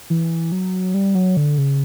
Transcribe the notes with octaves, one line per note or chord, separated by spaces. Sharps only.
E3
F#3
G3
F#3
D3
C#3